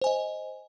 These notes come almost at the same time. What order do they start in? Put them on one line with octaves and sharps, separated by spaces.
C5 G#5 D#5